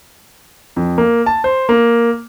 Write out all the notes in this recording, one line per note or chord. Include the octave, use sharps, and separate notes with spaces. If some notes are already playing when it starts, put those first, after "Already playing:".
F2
A#3
A5
C5
A#3